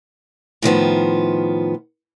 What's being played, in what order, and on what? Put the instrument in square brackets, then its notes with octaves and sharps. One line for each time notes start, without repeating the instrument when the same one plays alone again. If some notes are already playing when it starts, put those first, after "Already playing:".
[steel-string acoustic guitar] A2 D#3 F3 B3